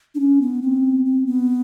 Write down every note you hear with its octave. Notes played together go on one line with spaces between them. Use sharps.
D4
C#4
B3
C4
C4
B3